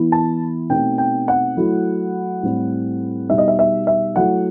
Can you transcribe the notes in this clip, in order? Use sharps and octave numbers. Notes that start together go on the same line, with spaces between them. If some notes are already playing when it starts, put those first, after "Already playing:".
Already playing: E3 B3 E4
A5
B2 A3 C4 D#4 G5
G5
F#5
F#3 A3 E4
A2 G3 C4 E4
B2 G3 D#4 E5
D#5
E5
E5
E5
F#3 A3 E4 F#5